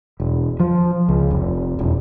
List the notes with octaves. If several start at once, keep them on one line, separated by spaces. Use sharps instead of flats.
E1
F3
C#2
F1
E1